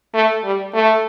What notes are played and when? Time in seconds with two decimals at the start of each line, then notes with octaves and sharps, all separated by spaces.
0.14 A3
0.44 G3
0.74 A3